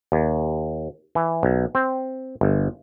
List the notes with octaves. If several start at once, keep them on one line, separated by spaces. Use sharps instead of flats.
D#2
E3
B1
C4
G1